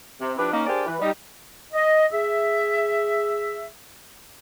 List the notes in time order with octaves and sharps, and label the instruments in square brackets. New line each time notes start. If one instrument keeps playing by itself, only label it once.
[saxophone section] C3
F3 D4 E4 G4 B4
A#3 C#4 D#4
D4 G4 G#4 A#4 C5 D5
E3 B4
G3 D#4
[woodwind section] D#5
G#4 E5